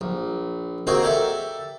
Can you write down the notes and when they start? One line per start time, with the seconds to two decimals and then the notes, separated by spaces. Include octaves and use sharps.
0.01 A#1
0.87 A#3 C4 D#4 F#4 G#4
1.03 G4 A4 D5 E5